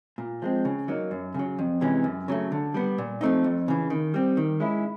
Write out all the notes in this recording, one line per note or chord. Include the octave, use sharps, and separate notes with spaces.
A#2
F3 G#3 C4
C#3
F#3 A#3 D#4
F#2
C#3 F#3
F2
C3 E3 G#3 C#4
F#2
C#3 F#3 A3
D3
G3 B3
A#2
F3 A3 C4 D#4
F2
C#3 E3
D#3
G3 C4
D#3
G#3 C#4 E4